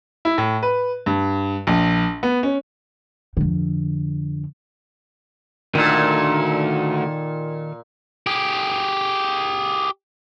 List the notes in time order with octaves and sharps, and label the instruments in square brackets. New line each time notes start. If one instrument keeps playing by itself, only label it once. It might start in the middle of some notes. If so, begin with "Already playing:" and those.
[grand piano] E4
A2
B4
G2
A#1
B3
C#4
[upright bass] F2 D3
[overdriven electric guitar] D2 [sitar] A#2 [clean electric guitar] D#3 A4
[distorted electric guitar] G4 G#4